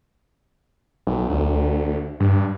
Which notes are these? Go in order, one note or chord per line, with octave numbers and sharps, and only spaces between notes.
B1
D2
G2